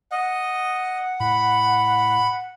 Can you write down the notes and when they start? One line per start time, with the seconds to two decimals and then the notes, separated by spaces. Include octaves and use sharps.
0.12 D#5 F#5
1.20 A2 B5